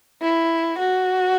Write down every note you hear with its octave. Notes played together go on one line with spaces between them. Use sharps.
E4
F#4